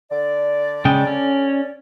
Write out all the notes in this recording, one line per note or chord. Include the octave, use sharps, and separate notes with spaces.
D3 D5
C#3 G#3 G5
C#4